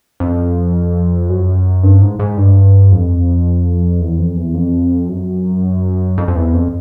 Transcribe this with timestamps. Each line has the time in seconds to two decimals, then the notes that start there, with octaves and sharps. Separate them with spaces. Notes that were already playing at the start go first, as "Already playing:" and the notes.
0.20 F2
1.30 F#2
1.83 G2
2.02 G#2
2.19 G#2
2.37 G2
2.92 F2
4.01 E2
4.18 F2
4.36 E2
4.54 F2
5.09 F#2
6.18 F2
6.28 F2
6.36 E2
6.53 F2